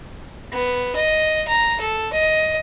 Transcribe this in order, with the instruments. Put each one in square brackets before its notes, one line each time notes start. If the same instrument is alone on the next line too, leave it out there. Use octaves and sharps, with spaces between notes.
[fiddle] B3
D#5
A#5
A4
D#5